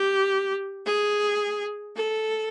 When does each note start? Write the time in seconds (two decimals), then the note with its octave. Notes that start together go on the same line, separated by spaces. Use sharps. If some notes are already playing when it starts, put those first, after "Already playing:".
Already playing: G4
0.86 G#4
1.96 A4